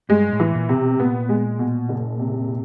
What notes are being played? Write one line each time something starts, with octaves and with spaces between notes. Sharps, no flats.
G2 G#3
A2
E3
A#2
C3
B2
A#2 B3
G#3
B2
F#1
C3